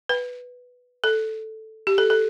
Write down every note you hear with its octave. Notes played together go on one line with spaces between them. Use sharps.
B4
A4
G4
A4
A4